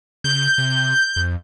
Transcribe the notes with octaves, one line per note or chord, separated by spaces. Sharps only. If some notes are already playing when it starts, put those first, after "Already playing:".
C#3 G6
C3
F2